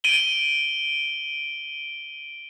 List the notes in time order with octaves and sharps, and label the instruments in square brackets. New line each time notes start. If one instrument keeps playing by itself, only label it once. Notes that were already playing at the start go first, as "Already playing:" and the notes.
[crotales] D7 D#7 F#7 G7